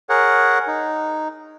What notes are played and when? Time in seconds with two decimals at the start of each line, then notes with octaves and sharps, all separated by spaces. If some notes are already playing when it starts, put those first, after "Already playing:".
0.09 G#4 A#4 C#5 F#5
0.67 D#4